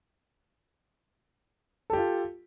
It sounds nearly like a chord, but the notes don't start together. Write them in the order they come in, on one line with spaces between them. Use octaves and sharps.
A4 G4 F4